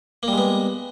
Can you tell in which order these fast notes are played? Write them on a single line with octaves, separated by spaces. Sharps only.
A#3 G3 G#3 B3